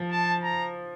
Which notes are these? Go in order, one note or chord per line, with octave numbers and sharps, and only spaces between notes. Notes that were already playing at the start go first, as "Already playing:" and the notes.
Already playing: F3
A5
A#5